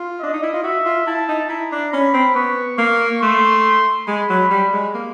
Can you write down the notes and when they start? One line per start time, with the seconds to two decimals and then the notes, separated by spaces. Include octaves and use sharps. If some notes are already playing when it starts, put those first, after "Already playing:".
Already playing: F4
0.20 D4 D#5
0.33 D#4
0.43 E4
0.54 F4
0.63 F#4 E5
0.86 F4
1.07 E4 A5
1.29 D#4
1.49 E4 A#5
1.72 D4
1.93 C#4 B5
2.14 C4
2.35 B3 C#6
2.78 A#3 C#6
3.22 A3 C6
4.08 G#3 B5
4.29 F#3
4.50 G3
4.73 G#3
4.95 A#3